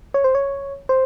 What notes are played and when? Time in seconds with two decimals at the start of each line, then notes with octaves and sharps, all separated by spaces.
0.14 C#5
0.24 C5
0.35 C#5
0.89 C5